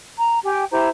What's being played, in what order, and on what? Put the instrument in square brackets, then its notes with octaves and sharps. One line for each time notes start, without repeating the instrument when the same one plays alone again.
[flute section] A#5
G4 G5 G#5
E4 G4 C5 A#5